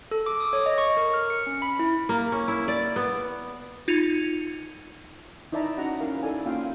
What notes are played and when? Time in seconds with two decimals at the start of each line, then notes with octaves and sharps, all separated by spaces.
0.11 A4
0.26 D6
0.40 D#6
0.53 C#5
0.66 D#5
0.78 C#6
0.97 A#4
1.14 F6
1.30 C#7
1.47 C#4
1.62 B5
1.79 E4
2.09 A#3
2.32 C#4
2.48 E4
2.68 D5
2.96 B3
3.88 D#4 F4 G#6 C#7 F7
5.52 D#4 E4 D5 E5 A5 A#5
5.77 C#4 D#4 F#4 F#5 A#5
5.99 C#4 E4 A#4 F5
6.23 D#4 E4 A4 D5 G#5
6.46 A#3 C#4 F4 F5 G5